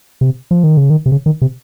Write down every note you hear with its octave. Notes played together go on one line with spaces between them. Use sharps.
C3
F3
D#3
C#3
D#3
C3
C#3
D#3
C3